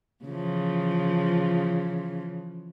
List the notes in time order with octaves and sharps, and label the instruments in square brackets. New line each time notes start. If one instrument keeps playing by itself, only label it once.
[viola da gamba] C#3 E3 F3